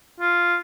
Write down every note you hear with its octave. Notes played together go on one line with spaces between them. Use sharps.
F4